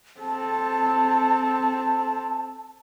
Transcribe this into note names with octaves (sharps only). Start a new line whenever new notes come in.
C4 A4 A5